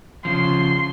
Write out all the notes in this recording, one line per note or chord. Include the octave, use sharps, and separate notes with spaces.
C#3 F3 C6